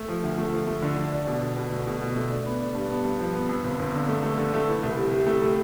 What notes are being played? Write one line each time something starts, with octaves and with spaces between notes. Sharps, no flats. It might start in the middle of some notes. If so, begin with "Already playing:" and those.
Already playing: A3
F3
D2
A3
F3
A3
D3
D3
D4
B2
D4
B2
A3
B2
B2
A3
D4
B3
D4
G2
B3
G2
F3
B3
F2
G1
G1
D3
A3
A3
D3
A3
E3
C2
C3
C3
A3
C3